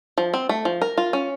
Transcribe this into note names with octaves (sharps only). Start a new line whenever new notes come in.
F3
C4
A3
F3
A#4
F4
C#4